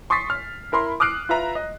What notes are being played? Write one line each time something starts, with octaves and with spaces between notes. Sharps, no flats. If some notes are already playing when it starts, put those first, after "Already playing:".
C6 C#6 D#6 A6 B6 C7
F6
E4 A#4 B5 C6
D6 D#6 F6 F#6 C7 D7
F4 B4 E5 A#5
D#5